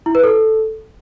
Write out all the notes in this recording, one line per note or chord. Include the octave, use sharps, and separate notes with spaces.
E4
B4
A4